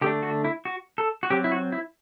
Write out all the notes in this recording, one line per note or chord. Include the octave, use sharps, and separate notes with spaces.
D3 A3 D4 G4
F#4
E4
F#4
A4
F#4
F#3 C4 G4
E4
F#4
E4